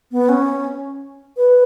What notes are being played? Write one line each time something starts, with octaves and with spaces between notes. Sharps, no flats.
B3
C#4
B4